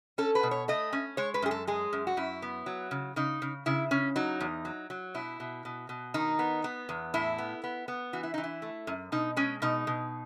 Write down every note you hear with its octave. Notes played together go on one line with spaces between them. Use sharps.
C#4 A4
B4
B2
C#5
A3 D#5
C#4
G#3 C#5
B4
F#2 G#4
A4
G#3 G#4
F#2
F#4
F#2 E4
B3
F#3
C#3
C#3 D#4
C#3
C#3 E4
C#3 C#4
F#3 D#4
E2
F#3
F#3
B2 E4
B2
B2
B2
D#3 D#4
B3
B3
E2
A2 E4
B3
B3
B3
E3 F#4
E4
E3 D#4
E4
A3
F#2
B2 D#4
G#3 C#4
B2 D#4
B2